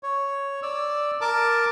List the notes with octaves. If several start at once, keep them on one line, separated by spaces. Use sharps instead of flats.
C#5
D5 E6
A#4 A5 D6